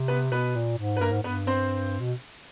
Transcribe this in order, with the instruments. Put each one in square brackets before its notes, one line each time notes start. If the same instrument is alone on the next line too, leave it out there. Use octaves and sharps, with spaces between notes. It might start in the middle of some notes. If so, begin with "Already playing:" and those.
Already playing: [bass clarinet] C3
[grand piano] B3 B4
[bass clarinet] B2 [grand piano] B3 B4
[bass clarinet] A#2
G#2
[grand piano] B4
[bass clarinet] G2 [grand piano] A#3 A#4
[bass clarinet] G#2
[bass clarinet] G2 [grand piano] B3 B4
[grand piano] C4 C5
[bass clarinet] B2